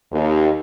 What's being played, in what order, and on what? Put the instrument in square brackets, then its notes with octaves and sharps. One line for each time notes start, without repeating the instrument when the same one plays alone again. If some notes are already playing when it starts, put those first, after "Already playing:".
[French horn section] D#2